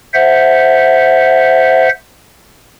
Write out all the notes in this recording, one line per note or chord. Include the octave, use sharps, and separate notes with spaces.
C5 E5 F#5